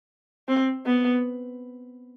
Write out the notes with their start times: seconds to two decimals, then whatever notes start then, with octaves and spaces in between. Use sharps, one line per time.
0.49 C4
0.86 B3